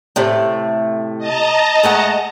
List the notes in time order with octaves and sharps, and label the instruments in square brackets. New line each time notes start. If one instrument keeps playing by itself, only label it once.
[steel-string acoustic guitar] A2 C3 A3
[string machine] D#5 A5 A#5
[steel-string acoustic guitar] G#3 A3 F#5